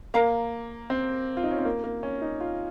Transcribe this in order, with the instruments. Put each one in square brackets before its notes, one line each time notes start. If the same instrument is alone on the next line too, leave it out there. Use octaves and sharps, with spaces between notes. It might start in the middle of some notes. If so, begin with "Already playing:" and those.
[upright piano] A#3 [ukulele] A#4 F5 A#5
[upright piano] C4
F4
D#4
C#4
C4
A#3
A#3
C#4
D#4
F4